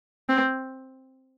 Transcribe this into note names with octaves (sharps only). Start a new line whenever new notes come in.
C4